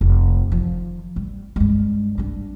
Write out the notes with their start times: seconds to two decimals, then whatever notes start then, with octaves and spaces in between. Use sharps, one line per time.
0.01 F1
0.52 D#3 F3
1.16 G3
1.56 G2 G#3
2.18 G3 D4